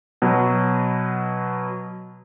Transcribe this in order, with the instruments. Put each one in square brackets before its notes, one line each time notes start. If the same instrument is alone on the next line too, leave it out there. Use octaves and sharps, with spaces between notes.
[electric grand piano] B2 F#3